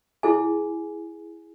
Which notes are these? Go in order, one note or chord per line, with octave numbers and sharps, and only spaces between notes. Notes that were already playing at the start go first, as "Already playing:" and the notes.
E4 G#4 G#5